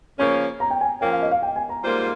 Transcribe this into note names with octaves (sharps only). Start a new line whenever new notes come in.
C#3 F3 A#3 C#4 C#6
A#5
G5
G#5
F3 A#3 C#4 G5
F5
D#5
F5
G5
G#5
A#5
G#2 G3 A#3 F4 C5